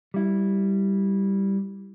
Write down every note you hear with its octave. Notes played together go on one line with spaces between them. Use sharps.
G3 E4